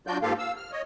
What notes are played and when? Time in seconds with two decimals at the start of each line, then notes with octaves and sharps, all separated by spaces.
0.07 F#3 D4 F4 F#4 D5 G6
0.22 G#2 A#3 F4 G4 A4 F5
0.38 F5 E6
0.57 F6
0.72 C#5 D#5